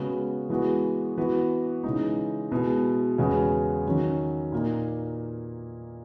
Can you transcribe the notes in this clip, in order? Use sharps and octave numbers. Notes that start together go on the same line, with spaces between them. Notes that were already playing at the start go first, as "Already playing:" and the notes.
Already playing: C#3 G#3 B3 F#4
E3 G#3 B3 F#4
E3 B3 F#4
C#3 E3 G#3 D#4
B2 G#3 B3 E4
E2 C#3 G#3 B3 F#4
D#3 F#3 C#4
A#2 A#3 D#4